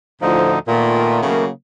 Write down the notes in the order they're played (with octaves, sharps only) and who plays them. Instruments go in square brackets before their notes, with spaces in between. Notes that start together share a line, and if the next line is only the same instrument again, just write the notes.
[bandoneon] D2 D3 D#4 [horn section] A2 F3
[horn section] A#2 [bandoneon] D#3 A3 B3
[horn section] C#3 F#3 A#3